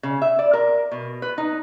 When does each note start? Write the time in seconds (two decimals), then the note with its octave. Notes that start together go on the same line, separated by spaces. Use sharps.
0.03 C#3
0.22 E5
0.39 D5
0.53 A#4
0.92 B2
1.22 B4
1.38 D#4